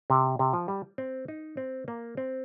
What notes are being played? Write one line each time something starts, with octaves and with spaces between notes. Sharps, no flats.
C3
C3
F3
G3
C4
D#4
C4
A#3
C4